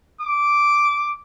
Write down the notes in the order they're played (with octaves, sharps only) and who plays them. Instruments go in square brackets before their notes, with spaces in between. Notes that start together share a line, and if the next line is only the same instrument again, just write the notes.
[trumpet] D6